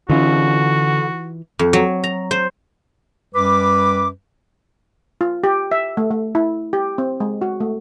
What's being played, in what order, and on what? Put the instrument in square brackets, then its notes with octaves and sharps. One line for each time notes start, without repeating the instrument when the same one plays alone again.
[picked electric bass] D3 C#4 [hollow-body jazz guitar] E3 D#4 F4 [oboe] F#4
[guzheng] F2
F#3
A#5
C5
[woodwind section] F#2 G3 B4 D6
[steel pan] F4
G4
E5
A3
A3
E4
G4
C4
G#3
F#4
A3